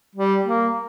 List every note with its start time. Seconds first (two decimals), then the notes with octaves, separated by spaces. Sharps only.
0.15 G3
0.46 A#3